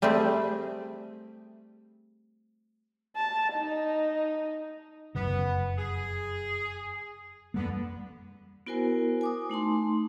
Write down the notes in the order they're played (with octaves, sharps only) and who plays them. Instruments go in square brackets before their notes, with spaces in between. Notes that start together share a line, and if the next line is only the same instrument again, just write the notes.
[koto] G3 A3 C4 G4 G#4
[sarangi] A5
D#4
[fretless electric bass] F1 F#2 C#3 [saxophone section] B3
[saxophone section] G#4
[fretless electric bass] F2 G3 A#3 [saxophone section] D3 B3
[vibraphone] B3 E4 F#4 A#4 C5 G#5
G#5 D6 D#6
A3 D#4 A5 C6